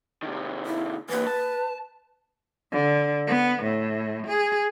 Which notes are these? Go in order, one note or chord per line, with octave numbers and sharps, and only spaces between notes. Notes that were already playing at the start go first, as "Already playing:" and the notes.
C3 D#3
E4
E3 A#3 B4
A5
D3
B3
A2
G#4